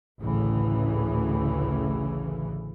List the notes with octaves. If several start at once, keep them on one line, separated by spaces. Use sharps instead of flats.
A1 D2 A2 C#3 E3